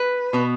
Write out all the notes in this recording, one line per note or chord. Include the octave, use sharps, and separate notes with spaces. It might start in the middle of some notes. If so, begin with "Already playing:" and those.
Already playing: B4
B2 B3